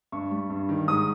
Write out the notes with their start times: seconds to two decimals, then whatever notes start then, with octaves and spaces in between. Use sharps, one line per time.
0.12 G2 C#6
0.31 G3
0.50 G2
0.69 D#3
0.88 G#2 D#6